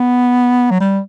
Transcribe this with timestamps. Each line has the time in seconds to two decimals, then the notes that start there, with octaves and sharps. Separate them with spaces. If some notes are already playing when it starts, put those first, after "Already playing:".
Already playing: B3
0.71 F#3
0.80 G3